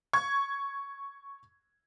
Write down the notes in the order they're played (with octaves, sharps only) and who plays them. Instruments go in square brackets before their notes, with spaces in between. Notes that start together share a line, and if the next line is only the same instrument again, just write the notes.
[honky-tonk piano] C#6 G#6